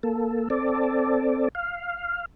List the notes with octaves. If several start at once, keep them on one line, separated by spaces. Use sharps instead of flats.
A#3 A4
C4 A4 D5
F5